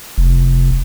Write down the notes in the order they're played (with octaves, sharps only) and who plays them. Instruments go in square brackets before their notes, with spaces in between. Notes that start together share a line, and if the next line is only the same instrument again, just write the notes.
[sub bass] F1